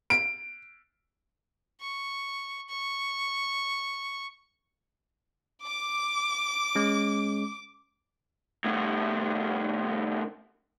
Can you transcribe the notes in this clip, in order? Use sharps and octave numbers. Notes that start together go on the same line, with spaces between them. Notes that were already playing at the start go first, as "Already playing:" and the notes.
D7
C#6
C#6
D6
G#3 C#4
C2 A2